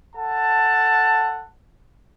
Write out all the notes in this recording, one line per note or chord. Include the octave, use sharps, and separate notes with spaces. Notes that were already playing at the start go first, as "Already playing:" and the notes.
A4 F#5 A5